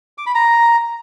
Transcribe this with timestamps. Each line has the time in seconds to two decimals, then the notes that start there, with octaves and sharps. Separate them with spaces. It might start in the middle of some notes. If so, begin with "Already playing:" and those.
0.18 D6
0.26 B5
0.35 A#5